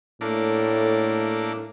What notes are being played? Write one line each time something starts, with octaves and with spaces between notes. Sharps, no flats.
A2 A3 A#3 D4